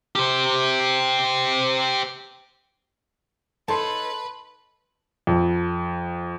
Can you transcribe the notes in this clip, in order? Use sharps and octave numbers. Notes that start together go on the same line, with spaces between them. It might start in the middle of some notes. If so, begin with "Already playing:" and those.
G4 C5
D#4 A4 B4 C#5 A5 C6
F2